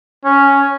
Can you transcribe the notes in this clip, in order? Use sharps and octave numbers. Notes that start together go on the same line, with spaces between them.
C#4